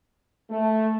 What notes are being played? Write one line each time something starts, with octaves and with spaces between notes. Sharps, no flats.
A3